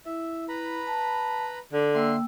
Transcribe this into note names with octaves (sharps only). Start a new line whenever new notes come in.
E4 E5
B4 A#5 B5
A5
D3 A4
A#3 E5 G5 C6 E6